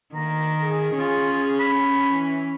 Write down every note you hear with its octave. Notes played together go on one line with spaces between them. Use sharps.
D2 D#3 A#3 A#5
G#4
C#4 F4
B5
E3